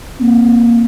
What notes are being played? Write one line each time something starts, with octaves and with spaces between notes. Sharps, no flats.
A#3 C4